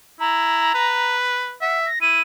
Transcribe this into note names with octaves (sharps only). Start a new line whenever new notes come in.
E4 A#5
B4
E5 F#5
A#6
E4 D#7